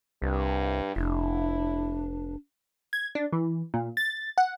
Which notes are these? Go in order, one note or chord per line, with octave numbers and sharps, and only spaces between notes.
C2 G2
F1 D4 E4
G#6
D4
E3
A#2
A6
F#5